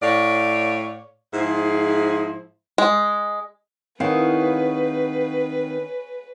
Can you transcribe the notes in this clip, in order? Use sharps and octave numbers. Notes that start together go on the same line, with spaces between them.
A2 C#5 D5 F5
G#2 F3 E4 G#4
G#3
D#3 C4 E4 G#4 B4 C#5 F5 F#5